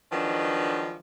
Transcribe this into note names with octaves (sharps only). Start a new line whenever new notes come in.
D#3 F3 F#3 G#3 D4 B4